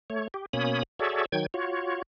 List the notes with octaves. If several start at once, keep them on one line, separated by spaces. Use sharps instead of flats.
A3 C#5
G4
B2 A#3 C#4 C#5 B5 D#6
F#4 G#4 A4 C#5 D5 E5
D#3 F#3 G5 G#6
F4 F#4 C#5